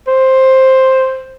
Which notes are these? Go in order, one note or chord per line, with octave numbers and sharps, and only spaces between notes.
C5